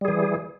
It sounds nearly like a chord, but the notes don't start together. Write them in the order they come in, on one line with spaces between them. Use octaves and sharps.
G3 G#4 E3